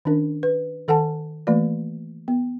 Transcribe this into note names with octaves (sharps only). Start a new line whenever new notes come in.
D#3 C#4 D4 A#4
B4
D#3 A4 F#5 G#5 A5
E3 A3 A#3 F#4 D5
B3